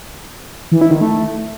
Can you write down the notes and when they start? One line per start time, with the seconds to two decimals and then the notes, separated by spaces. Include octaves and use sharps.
0.71 E3
0.81 E4
0.91 D#3
1.01 A3